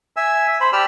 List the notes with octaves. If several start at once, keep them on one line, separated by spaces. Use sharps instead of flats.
E5 G#5 E6
E5
C5 B5
G4 D5 A5 B5 E6 F6